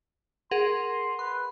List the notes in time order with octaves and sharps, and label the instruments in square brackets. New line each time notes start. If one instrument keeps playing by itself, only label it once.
[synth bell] G#4 A#4 F#5 [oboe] C6
[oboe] B4 [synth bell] C6